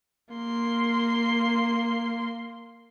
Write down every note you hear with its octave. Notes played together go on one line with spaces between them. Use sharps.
A#3 C6